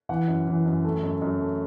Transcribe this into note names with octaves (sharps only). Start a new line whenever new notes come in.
E3 F#5
F#2
E3
F#2
A3
F#2
F#2
A3